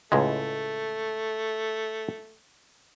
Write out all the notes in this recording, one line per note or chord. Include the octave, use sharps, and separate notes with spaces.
C#2 A2 G#3 A3